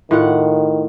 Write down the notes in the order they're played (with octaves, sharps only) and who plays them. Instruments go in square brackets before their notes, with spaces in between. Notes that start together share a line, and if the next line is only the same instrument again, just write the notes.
[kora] A2 F4 F#5 [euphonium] D#3